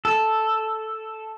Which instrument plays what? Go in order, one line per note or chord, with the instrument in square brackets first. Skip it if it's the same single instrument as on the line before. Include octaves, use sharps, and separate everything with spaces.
[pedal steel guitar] A4